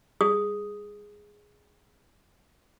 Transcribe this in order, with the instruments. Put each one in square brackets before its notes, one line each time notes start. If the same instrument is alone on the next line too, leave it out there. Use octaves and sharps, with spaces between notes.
[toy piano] G#4 D#6